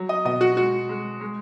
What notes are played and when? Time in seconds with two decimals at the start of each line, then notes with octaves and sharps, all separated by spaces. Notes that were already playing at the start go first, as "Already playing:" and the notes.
Already playing: F#3
0.09 D#5
0.25 B2 D#5
0.41 F#4
0.57 G#3 F#4
0.89 G#3
1.21 G#3